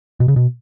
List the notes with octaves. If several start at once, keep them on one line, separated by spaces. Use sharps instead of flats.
B2
C#3
B2